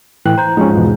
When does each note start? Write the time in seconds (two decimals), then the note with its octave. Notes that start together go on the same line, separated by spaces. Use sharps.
0.25 A2 E3 G5 F#6
0.38 C5 A#5 G6
0.57 G#2 F3 C#4 D#4
0.77 E2 B2